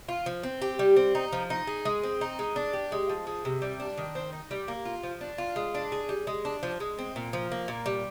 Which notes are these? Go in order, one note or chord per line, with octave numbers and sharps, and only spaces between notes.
F4
F3
C4
G4
G3
C4
D#4
F3
D#4
G#4
G#3
C4
D#4
G#3
D4
G4
G#3
F3
G#3
C3
G3
D4
D#3
C4
D#4
G3
A#3
F4
F3
D4
F4
G#3
D4
G#4
G3
G#3
D4
F3
G#3
C4
A#2
F3
A#3
A#2
G3